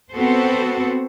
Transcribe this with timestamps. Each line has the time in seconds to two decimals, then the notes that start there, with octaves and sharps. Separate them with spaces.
0.13 B3 C4 F#4 A4 C5